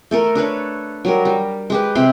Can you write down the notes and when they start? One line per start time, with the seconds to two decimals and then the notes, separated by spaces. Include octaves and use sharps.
0.11 A3 A4 A#4
0.35 D4 A4 B4 C#5
1.05 F#3 G3 A#4
1.25 G3
1.70 G#3 G4 B4
1.95 C3 G4 B5 C6